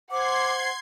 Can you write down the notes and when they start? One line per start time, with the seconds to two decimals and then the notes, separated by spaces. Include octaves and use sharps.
0.11 C5 F#5 C6 D6 G#6 C7